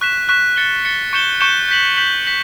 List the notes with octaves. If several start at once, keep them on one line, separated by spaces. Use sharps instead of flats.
C#6 F#6 B6 E7
C#6 F#6 B6 E7
A6 C#7 G7
A6 C#7 G7
C#6 G6 C#7 E7 G7
C#6 G6 C#7 E7 G7
G6 B6 F#7
G6 B6 F#7
B6 F#7